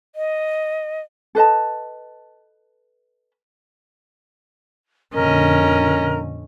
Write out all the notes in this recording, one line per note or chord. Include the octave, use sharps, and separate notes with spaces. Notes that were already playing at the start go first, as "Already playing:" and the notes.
D#5
A4 B4 D#5 A5
F2 A#2 D3 C#4 A#4 D#5 A#5